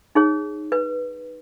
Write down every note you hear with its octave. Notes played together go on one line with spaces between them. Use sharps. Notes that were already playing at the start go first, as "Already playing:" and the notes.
D#4 G#4 C#5
B4